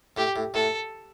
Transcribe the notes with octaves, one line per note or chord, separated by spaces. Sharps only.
A2 G4
A2
A2 A4